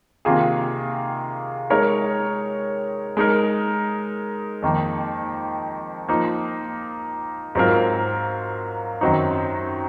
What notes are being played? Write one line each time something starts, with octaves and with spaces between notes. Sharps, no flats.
C3 D#3 A#3 F4 G#4
G#3 D#4 A#4 C#5
G#3 D#4 A#4
F2 D#3 A#3
F3 A#3 D#4
G#2 F#3 C4 F4 A#4
F#2 D#3 F#3 C4 D#4